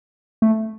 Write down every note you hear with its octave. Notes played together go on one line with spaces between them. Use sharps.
A3